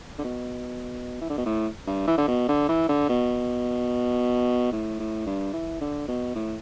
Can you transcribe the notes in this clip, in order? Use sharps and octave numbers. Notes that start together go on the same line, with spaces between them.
D3
B2
E3
D3
B2
A2
G2
E3
D3
B2
D3
E3
D3
B2
A2
A2
G2
E3
D3
B2
A2